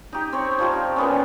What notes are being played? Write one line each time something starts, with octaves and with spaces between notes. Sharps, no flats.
D#4 G4
C4 C#5
F3 G3 F4 G4
A#2 B3 C#4